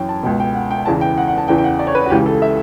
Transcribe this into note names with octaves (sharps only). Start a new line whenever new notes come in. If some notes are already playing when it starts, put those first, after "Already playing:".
Already playing: F#2 E3 C#5 G5
A5
C#2 B2 G5
G5
F#5
G5
E2 C#3 E3 A5
G5
F#5
F#5
A5
E2 C#3 E3 G5
G5
F#5
D5
C#5
B4
F#4
C#2 C#3 E3 G4
A4
E5